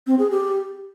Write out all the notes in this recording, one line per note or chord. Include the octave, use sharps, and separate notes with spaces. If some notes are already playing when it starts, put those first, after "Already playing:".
C4
G#4
G4